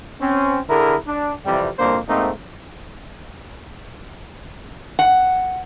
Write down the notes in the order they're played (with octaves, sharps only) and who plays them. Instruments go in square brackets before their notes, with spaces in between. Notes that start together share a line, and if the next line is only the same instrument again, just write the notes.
[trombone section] C4 C#4
D3 E4 G#4 A#4
D4
F2 C3 E3 G3
C2 F2 A#2 A#3 D4 C5
G#2 A3 A#3 C4 D#4
[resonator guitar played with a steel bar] F#5